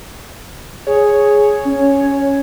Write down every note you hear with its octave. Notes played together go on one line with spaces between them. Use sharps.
G#4 C#5
C#4